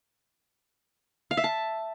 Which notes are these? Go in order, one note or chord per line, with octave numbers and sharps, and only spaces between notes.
F5
E5
A5